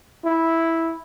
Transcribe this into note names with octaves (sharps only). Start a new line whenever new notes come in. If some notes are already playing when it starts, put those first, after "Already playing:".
E4